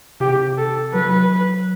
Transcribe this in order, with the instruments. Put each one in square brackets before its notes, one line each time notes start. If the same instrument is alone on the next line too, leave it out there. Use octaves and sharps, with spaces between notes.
[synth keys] C3 [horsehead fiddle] G4
[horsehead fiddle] A4
[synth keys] F#3 [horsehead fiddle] B4